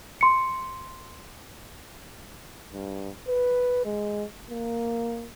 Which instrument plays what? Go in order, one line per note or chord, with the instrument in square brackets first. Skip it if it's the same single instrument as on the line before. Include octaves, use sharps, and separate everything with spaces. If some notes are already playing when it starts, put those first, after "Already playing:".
[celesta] C6 C#7
[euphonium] G2
B4
G#3
A#3